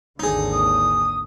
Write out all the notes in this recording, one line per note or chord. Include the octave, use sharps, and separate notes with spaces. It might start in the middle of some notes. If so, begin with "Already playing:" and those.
G#1 D#2 D3 D#4 G#4
D#6